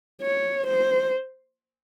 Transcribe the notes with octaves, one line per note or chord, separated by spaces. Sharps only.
C#5
C5